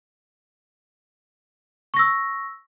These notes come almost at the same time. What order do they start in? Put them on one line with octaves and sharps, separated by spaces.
C#6 A#6 E6